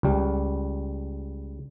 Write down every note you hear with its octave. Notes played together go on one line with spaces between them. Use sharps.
C#2 G3